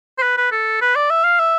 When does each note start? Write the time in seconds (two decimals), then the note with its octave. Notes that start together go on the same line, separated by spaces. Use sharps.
0.18 C5
0.22 B4
0.37 B4
0.51 A4
0.81 B4
0.96 D5
1.10 E5
1.24 F5
1.40 E5